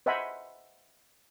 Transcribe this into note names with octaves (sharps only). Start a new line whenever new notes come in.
C5 D#5 E5 F#5 G#5 B5